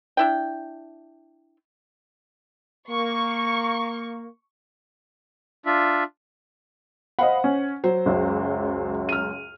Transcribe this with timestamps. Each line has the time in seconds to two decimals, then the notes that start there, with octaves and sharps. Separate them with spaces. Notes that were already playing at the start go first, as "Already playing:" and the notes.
0.17 D4 E4 G5
2.90 A#3 C#6
5.66 D4 F4 E5
7.19 C5 D#5 F5 F#5 B5
7.44 C#4
7.84 F#3 C5
8.06 C#2 F#2
9.09 F6 D#7